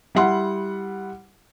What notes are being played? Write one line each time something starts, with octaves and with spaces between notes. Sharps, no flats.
G3 E4 F#5 C6